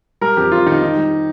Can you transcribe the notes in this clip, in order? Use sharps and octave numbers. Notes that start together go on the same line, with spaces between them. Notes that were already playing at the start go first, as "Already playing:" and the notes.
G3 A#4
F2 G4
F2 F4
D#3 D#4
D#3
G3